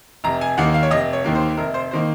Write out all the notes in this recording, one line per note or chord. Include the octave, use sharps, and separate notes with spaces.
F1 A#5
G#5
D#2 D#3 A#3 F#5
F5
C#5
F1 D#5
C#5
D#2 D#3 A#3
C5
F1 A#4
C5
D#3 A#3 C5